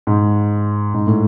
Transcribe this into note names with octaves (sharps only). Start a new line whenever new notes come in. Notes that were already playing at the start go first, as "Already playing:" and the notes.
G#2
G#2
A2